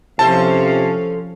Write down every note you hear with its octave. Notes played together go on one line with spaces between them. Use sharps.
C3 F3 C#4 E4 A4 C5 F5 A5